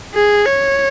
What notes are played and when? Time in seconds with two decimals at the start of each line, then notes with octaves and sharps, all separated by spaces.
0.14 G#4
0.46 C#5